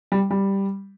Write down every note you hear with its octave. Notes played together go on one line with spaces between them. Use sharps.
G3
G3